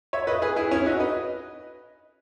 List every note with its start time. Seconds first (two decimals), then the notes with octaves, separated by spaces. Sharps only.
0.13 C#5 E5
0.27 B4 D#5
0.42 G#4 B4
0.56 E4 G#4
0.71 C#4 E4
0.86 D#4 F#4
0.99 B4 D#5